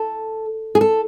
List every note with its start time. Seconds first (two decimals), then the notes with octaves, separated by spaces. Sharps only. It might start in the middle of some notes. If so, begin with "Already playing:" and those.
Already playing: A4
0.75 G#4
0.81 A4